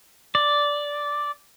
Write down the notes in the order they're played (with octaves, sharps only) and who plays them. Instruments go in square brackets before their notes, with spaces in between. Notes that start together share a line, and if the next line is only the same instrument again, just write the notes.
[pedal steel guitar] D5